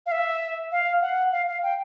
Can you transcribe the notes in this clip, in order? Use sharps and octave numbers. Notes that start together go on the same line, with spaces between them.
F5
E5
F5
F#5
F5
F5
G5